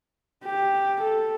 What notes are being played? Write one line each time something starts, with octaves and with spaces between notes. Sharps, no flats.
G4
A4